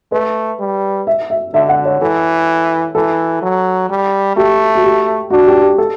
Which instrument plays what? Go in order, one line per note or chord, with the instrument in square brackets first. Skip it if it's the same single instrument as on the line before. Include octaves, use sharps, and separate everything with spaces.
[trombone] A3 [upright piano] B4
[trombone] G3
[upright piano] E5
E5
[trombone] D3 [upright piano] E5
[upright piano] F#5
C#5
[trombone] E3 [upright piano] A4
[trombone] E3 [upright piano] A4
[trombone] F#3
G3
[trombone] A3 [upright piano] G4
[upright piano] F#4
G4
[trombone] D4 [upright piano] F#4
[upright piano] G4
G4
A4